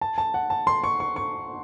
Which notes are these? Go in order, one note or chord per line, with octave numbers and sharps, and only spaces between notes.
A5
A5
F#5
A5
C6
C#6
C#6
C#6